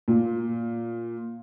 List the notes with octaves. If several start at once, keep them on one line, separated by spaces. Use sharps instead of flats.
A#2